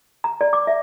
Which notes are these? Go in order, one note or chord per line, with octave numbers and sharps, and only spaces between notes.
A#5
D5
D6
E5